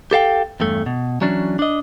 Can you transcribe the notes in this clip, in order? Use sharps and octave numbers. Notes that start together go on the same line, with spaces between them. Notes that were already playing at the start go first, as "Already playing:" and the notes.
G4 A4 F5 G5
E2 G2 A3
B2
E3 F#3 C#4 D4
D4 D#5